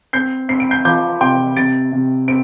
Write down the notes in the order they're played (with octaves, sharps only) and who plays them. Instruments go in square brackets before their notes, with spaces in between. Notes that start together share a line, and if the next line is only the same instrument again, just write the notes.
[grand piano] C4 [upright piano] G6 C7
[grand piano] C4 [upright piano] C7
[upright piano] D7
G6 C7
[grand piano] F3 [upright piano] D6 G6
[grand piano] C3 [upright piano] G5 C6
[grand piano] C3 [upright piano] A6 D7
[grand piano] C3
[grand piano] C4 [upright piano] D7